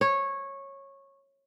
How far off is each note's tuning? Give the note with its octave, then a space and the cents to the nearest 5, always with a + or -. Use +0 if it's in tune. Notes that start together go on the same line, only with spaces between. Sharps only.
C#5 -15